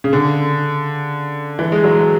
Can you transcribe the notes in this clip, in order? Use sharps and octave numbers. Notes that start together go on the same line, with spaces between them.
C#3
D3
E3
G#3
F#3